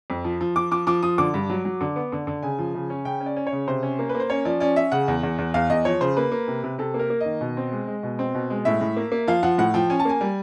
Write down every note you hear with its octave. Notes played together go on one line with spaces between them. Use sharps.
F2
F3
F3
F3 D6
F3 D6
F3 D6
F3 D#6
D3 D6
G2
F#3
F#3
D3
B3
D3
D3
C#3 G#5
F3
C#3
C#4
C#3 G5
C#4
D5
C#4
C#5
C#3
C3 C5
C#4
A#3
B4
A#3
C5
C#4 C#5
F3 D5
C#4 D5
C#4 E5
C#3 F#5
E2
E2
E2
E2 F5
E2 D#5
F3 C#5
C#3 C5
A#3 B4
A#3
C3
C3
C3 A4
A#3
A#4
A#3
D#3 D#5
B2
C4
G#3
G#3
B2
C4
B2
G#3
A2 E5
A2
A#3
A#3
F3 F5
F3 F#5
A2 F#5
F3 G5
C#4 G#5
A5
A#3 G#5
G3